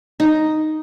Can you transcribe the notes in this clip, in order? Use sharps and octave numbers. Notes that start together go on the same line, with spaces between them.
D#4